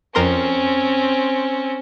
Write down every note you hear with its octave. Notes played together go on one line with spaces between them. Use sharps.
F2 C4 C#4 A#4 C6